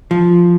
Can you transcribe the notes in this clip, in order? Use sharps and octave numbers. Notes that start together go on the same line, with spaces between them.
F3